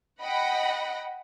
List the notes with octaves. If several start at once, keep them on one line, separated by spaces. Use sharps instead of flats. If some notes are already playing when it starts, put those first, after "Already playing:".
D#5 F#5 G5 B5 A#6